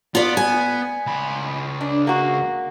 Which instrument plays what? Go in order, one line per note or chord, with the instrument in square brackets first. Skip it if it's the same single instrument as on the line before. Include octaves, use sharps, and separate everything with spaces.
[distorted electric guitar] B3 [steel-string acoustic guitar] F4 D5
[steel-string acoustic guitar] G#5
[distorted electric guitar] C#2 B5
[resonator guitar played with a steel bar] D4
A#3 F#4